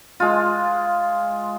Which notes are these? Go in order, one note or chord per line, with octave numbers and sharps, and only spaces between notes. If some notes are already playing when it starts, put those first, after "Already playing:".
G#3 F4